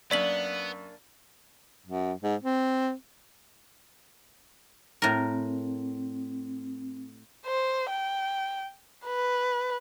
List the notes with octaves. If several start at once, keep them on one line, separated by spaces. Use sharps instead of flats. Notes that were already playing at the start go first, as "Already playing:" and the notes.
F#2 A#3 B3 D4 D5 B6 F#7
F#2
G#2
C4
A2 C4 A#4
C5
G5
B4